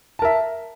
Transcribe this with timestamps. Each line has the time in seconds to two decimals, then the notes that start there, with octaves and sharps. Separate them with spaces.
0.19 A5
0.22 A#4
0.25 E5